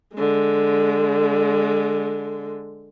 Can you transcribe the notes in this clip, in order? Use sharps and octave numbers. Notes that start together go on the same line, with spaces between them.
D3 G#3